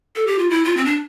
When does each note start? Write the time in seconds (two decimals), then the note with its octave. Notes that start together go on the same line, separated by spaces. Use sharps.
0.16 A4
0.27 G4
0.39 F4
0.50 E4
0.65 F4
0.77 C4
0.85 D4